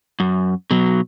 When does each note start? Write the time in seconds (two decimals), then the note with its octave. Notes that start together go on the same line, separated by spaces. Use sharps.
0.20 F#2
0.71 B2 F#3